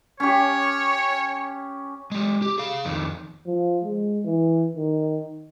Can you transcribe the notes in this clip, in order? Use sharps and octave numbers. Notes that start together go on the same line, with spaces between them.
C#4 G4 C#5
G#3 G4
G4
G#4 F5
F2 D#3
F3
G#3
E3
D#3